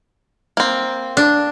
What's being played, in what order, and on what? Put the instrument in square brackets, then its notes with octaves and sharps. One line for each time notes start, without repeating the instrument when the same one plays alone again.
[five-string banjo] A#3 C4
[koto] D4